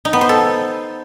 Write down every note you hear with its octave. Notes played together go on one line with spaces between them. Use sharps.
D#4
B3
C5
A4